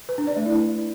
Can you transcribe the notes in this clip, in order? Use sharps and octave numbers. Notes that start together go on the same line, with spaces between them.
B4
D4
D5
A3
E4